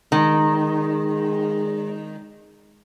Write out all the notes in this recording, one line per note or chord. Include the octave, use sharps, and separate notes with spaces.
D#3 G#3